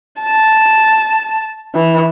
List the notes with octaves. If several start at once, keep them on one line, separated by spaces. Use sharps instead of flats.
A5
E3